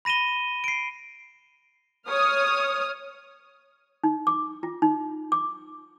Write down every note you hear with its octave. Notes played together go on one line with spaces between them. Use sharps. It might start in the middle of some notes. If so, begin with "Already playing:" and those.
B5 A#6 D#7 E7 G7
C7 D7
C#5 D#6 F6
D#4
D6
F4
D#4
D6